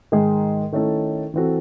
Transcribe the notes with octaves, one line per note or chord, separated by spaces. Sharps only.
G#2 D#3 G#3 D#4 G#4
D#3 A3 C#4 E4 A4
E3 C4 F#4 A4